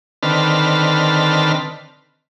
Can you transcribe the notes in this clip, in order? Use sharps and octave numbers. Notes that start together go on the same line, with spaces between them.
D3 D#3 C4 B4 A5 F6